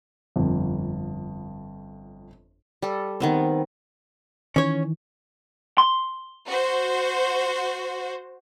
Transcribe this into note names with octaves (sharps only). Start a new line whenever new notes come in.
G1 F2
G3 A4
D#3 B3 C4
D#3 E3 C#4 C#5
C6
F#4 C5